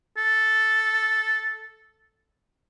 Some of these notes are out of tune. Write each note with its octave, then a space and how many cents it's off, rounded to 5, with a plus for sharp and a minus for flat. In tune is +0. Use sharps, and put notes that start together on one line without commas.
A4 -5